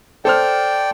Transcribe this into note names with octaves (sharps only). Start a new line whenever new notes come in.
A4 C5 D5 G5 F6